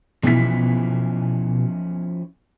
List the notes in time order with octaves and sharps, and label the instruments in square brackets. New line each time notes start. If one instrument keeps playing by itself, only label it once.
[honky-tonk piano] B1 E3 B6 [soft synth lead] B2 [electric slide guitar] F3 C#4 E4